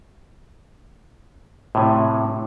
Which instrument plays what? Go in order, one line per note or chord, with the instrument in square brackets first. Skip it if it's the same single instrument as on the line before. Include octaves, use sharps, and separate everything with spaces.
[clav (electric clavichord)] A2 C3 G#5